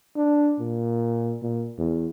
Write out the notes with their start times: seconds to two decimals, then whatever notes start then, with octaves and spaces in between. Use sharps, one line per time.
0.16 D4
0.60 A#2
1.42 A#2
1.78 E2